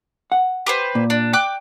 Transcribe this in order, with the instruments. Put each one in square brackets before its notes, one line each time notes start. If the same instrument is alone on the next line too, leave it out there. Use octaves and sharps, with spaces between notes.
[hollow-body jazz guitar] F#5
[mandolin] G4 B4 C5
[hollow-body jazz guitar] A#2
[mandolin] D4
G5 D6 F#6